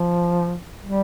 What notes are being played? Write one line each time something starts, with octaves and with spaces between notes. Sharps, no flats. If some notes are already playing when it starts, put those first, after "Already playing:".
Already playing: F3
G3